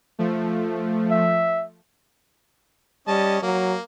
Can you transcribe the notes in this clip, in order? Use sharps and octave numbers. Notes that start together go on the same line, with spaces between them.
F3 A3
E5
G3 C#4 D#5 A5
F#3 A#3